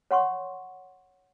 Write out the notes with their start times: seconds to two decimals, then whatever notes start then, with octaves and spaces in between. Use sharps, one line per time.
0.11 C#5 F#5 C6 C#6